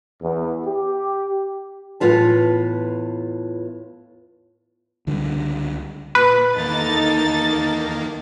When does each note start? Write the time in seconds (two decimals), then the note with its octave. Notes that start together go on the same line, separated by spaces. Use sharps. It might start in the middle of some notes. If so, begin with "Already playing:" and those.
0.22 E2
0.66 G4
2.00 E2 A2 F4 B4 A5
5.07 C#2 D3 G3
6.15 A#2 B4
6.57 E2 D#3 A#3 D#4 A4 A6